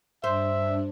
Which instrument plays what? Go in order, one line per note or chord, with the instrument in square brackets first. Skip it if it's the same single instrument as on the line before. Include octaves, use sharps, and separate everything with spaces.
[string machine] G2 D4 [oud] C5 [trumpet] E5